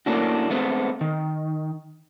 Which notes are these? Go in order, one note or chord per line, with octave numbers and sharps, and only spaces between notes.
A3 A#3 C#4 D4 E4 F#4
G#3 A3 B3 C4
D#3